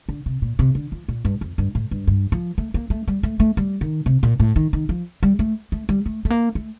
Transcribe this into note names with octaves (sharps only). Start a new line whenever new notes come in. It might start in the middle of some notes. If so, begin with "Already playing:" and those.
D3
C3
A#2
C3
D3
F3
A#2
G2
F2
G2
A2
G2
G2
F3
A3
A#3
A3
G3
A3
A3
G3
D#3
C3
A#2
A2
D#3
D#3
F3
G3
A3
A3
G3
A3
A3
A#3
A3